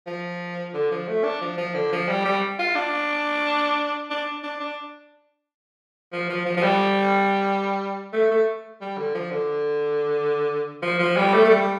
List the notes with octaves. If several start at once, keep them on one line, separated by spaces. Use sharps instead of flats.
F3
D3
F3
A3
D4
F3
F3
D3
F3
G3
G3
F4
D4
D4
D4
D4
F3
F3
F3
F3
G3
A3
A3
G3
D3
F3
D3
F3
F3
G3
A3
A3
G3